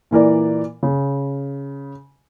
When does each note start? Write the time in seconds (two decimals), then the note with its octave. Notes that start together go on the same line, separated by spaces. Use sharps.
0.11 A#2 E3 A#4 D5
0.83 C#3